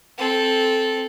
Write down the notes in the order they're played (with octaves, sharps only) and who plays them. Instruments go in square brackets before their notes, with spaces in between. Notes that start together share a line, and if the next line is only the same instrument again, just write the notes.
[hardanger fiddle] C4 A4